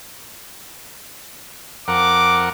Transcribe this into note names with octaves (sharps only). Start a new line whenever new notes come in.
F2 A#4 F#5 D6